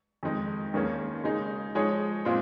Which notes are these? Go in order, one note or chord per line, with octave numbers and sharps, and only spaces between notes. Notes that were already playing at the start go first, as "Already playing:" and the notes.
F2 D#3 G#3 D#4
D#2 D#3 A#3 C#4 G#4
C#3 G#3 D#4 G#4
F3 G#3 D#4 G#4 C#5
A#2 G#3 C4 F4 C5